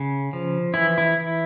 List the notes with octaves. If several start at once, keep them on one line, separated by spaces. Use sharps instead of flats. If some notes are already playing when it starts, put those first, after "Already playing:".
Already playing: C#3
F3
E3 E4
E4